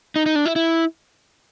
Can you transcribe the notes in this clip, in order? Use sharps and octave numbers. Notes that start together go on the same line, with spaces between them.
D#4
D#4
D4
E4
E4